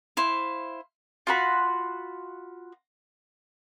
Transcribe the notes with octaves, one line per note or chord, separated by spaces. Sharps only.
E4 C5 F5
F4 F#4 B5